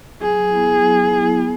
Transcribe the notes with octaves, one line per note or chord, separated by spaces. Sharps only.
F#3 G#4
B3 E4
F#3
B3 E4
B3